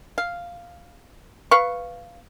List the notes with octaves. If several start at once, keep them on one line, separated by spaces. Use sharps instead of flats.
F5
B4 F5 C#6